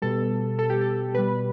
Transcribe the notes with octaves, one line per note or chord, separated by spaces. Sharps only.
B2 G3 A4
A4
G4
A4
B2 G3 B4